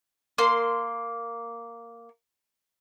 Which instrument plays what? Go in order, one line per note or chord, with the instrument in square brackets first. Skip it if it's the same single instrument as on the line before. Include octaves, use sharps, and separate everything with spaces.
[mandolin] A#3 C6